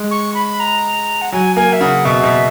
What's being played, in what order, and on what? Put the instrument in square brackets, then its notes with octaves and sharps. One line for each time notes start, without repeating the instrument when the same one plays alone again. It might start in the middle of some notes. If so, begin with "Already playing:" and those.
Already playing: [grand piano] G#3
[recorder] C#6
B5
A#5
F#5
[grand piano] F#3 [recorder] G#5
[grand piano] A#3 [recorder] G#5
[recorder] E5
[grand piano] C#3 [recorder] F#5
[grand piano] B2 [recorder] E5
[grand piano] B2